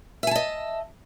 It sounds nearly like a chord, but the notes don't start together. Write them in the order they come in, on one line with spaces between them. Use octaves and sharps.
E5 G#5 A5 D#5